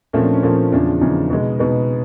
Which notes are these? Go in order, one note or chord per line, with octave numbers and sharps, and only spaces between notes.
A#2 F3 A3 C4 C#4
D4
C#4
A#2 F3 A3 C4
E2 C#3 F3 D4
E2 C#3 F3 D#4
B2 G#3 B3
B2 G#3 B3 D#4